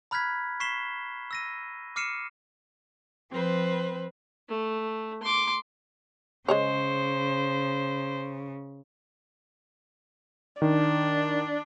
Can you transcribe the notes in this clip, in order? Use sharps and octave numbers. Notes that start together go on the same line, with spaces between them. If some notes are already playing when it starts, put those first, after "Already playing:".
A#5 B5 F6 F#6 G#6 B6
C#6 B6 C7 E7 G7
E6 A#6 D#7
D6 F6 C7 C#7 D#7 E7
F3 C4 B4 C5
A3
C6 D6
C#3 G#3 G#4 C5 C#5
D#3 D4